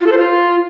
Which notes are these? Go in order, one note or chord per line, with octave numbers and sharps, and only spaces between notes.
F4
A4
C5
F4